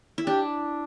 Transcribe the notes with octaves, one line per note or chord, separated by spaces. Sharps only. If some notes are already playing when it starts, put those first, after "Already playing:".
E4
D4 G4